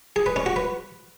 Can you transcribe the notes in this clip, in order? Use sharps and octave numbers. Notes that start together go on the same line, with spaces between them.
G#4
B4
C#4
F#4
B4